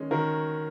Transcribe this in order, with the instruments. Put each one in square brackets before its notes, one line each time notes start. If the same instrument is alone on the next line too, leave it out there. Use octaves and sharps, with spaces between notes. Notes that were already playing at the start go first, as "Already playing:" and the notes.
Already playing: [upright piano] D#3 G#3 C#4
[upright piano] D#3 [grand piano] F#4 A#4